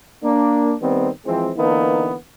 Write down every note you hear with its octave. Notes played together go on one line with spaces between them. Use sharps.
A#3 D4
D#3 G3 B3 C4
E3 F3 G#3 C4
D3 E3 A#3 B3 D#4